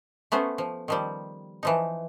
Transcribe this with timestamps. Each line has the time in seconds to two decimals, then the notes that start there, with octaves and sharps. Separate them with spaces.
0.32 A3 B3 C#4 C5
0.58 F3
0.88 D#3 F3 G3
1.63 E3 F3 D#4